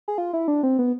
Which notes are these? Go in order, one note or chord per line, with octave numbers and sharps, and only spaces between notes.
G#4
F4
E4
D4
C4
B3